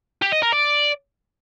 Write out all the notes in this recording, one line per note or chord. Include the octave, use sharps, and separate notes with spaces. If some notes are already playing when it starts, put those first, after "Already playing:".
G4
D#5
A#4
D5